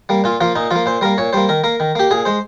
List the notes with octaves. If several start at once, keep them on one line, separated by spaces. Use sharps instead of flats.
G3 A#3
A#2 F4
F3 A#3 F4
A#2 D#4
F3 A#3 F4
A#2 C5
G3 A#3 A#4
A#2 C#5
G3 A#3 C5
D#3 A#4
A#3 A#4
D#3
A#3 G4
A#2 G#4
G#3 C5